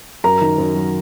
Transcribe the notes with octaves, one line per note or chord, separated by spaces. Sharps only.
F#2 A#4 A#5
D#3
F#2
F#3